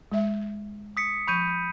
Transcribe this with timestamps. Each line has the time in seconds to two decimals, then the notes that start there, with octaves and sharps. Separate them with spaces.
0.12 G#3 E5
0.97 D#6 B6 C#7
1.28 F3 B5 C#6 G6 D#7